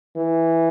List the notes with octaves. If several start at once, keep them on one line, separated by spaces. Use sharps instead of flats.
E3